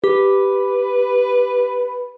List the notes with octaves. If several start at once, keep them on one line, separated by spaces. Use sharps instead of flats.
G4 B4